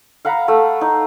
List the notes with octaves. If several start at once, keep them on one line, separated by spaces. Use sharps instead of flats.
F5 F#5 A#5 B5
A3
D#4